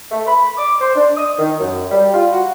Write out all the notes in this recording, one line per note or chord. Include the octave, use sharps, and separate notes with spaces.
A3
B5
D6
C5
D4
D#6
D#3
F#2
G3
F4
F#4